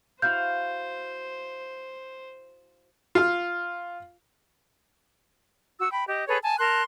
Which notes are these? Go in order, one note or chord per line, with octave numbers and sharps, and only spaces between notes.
E4 F#4 C5 F5 G6
F4 F5
F#4 E6
G5 B5
G4 D#5
G#4 A4 B4 C#5
G#5 A5
A#4 A5 C6 F#6